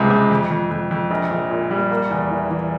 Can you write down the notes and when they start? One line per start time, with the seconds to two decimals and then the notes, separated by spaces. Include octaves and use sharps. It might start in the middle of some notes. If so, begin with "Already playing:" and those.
Already playing: C#2 C3 G#3
0.11 C#2
0.31 F2
0.51 F2
0.71 F2
0.91 F2
1.11 A#1
1.31 A#1
1.50 A#2
1.71 G3
1.90 A#3
2.10 E2
2.31 E3
2.50 E3